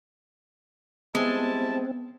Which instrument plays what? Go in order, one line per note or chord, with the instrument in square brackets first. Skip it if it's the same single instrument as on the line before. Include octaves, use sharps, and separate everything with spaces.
[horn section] G3 E4 A5 [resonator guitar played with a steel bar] G#3 [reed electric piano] B3 [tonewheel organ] C4